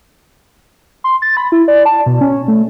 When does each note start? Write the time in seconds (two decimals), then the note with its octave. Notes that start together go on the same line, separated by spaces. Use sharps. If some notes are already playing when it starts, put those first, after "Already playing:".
1.04 C6
1.22 A6
1.37 B5
1.52 E4
1.68 D5
1.86 A5
2.06 B2
2.21 C#4
2.48 A3